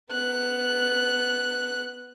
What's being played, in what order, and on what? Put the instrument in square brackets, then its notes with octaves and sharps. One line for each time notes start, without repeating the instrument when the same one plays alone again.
[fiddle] B3 F#6